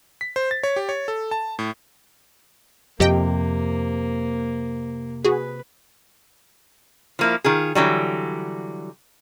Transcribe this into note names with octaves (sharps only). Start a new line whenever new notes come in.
B6
C5
A6
C#5
G4
C#5
A4
A5
A2
F2 C3 A#3 G4 D#5 G5
F#4 G#4 B4
F3 A#3 E4
D#3 F4 G#4
D3 E3 F#3 G3